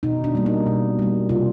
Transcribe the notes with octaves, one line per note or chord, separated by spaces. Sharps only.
B2 D#4
D4
G3 A#3
D#4
B2
G3 A#3
C3 F4